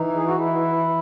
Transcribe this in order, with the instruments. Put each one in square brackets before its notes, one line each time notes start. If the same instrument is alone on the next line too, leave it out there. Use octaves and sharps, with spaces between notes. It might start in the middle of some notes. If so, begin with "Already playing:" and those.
Already playing: [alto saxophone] E3 [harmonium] D#4
[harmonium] G#4
F#4
E4